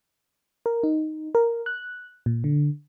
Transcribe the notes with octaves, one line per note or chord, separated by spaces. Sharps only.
A#4
D#4
A#4
F#6
A#2
D3